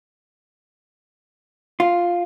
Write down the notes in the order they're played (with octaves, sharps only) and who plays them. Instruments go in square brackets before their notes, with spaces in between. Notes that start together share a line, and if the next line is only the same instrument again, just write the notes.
[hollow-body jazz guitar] F4